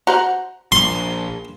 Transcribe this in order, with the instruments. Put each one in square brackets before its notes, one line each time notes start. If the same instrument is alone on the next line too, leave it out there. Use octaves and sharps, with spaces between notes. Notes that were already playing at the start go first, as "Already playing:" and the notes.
[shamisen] F#4 C5 F#5 [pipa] A#5
[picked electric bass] A#1 [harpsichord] C6